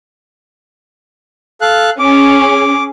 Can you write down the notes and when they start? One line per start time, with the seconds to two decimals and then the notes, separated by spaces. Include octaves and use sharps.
1.62 A4 F5 F#6
1.99 C#4 G#4 D6